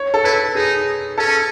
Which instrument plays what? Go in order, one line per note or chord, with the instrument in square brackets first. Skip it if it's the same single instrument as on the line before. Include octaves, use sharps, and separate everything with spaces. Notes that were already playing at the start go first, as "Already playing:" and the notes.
Already playing: [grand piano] C#5
A4
[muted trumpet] E4 [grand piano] B4
[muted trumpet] D#4 [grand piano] G#4
[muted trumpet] C#4 [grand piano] A4